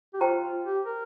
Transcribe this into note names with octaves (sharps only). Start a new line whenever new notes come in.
G4
F4 C5 G5 A#5
F4
G4
A#4